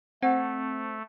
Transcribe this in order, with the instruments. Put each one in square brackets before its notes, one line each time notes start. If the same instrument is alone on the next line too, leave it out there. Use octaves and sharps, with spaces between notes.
[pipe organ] A3 [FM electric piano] C4 [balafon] F#5